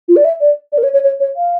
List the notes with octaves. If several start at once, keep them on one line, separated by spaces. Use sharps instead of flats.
F4
D5
E5
D5
D5
A#4
C#5
C#5
C#5
C#5
F5